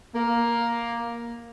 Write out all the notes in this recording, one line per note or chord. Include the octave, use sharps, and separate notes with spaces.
A#3